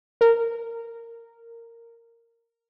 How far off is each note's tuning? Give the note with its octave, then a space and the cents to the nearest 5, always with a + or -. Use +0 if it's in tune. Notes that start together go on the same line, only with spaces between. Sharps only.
A#4 -10